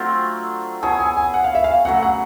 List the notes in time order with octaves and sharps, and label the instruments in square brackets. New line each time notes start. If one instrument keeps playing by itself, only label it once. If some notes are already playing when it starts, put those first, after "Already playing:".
Already playing: [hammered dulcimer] F#3 A3 C4 D4 F4
[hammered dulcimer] B3 E4 G#4 C#5 [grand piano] A5
[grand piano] G#5
G#5
F#5
F5
E5
F5
[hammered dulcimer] C#3 F#3 A3 [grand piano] F#5
[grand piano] F#5